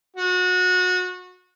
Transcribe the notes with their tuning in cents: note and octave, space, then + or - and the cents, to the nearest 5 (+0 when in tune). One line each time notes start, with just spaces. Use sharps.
F#4 -25